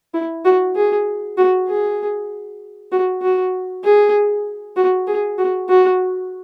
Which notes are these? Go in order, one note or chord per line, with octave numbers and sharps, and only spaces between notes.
E4
F#4
G#4
F#4
G#4
F#4
F#4
G#4
F#4
G#4
F#4
F#4